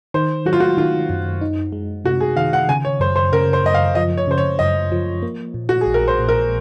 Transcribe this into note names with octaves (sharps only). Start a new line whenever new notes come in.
D#3 C5
F#3 F#4
F4
F#4
D#3 F4
F#2
D#4
G#3
C3 F#4
G#4
D#3 F5
F#5
C#3 G#5
C#5
F#2 C5
C5
C#3 A#4
C5
F#2 D#5
F5
F3 D#5
C#5
C#3 C5
C#5
F#2 D#5
F3
A#3
A#2
F#4
G#4
A#1
A#4
C5
A#2
A#4